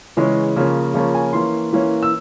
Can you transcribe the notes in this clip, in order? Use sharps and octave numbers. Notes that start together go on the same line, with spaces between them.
C#3 E3 G#3 C#4
C#3 F3 A#3 C#4
C#3 F3 A#3 C#4
G#5
E3 A#3 C#4 C6
E3 A#3 C#4
E6